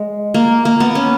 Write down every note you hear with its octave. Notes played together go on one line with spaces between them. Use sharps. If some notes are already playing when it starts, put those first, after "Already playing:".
Already playing: G#3
A#3
A#3
B3
C#4